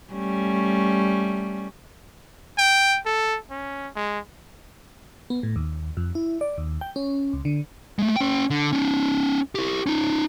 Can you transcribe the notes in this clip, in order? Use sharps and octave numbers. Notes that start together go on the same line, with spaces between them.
G3 A3 C#4
G5
A4
C#4
G#3
B3
A2
D#2
F2
E4
D5
D#2
G5
C#4
C#2
D3
G#3 A3
C#4 G5
D3
C#4 D#4
E4 G4
C#4 D#4